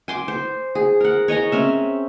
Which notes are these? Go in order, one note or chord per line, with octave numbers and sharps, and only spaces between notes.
G#5 C6 D6
C5
G#4
A#4 F#5
C#5 D#5 G#5 A#5
C4 C#4 E5